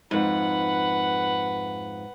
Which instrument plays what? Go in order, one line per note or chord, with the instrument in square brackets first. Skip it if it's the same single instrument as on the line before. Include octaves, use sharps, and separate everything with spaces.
[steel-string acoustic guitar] F2 G#2 [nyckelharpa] B4 F#5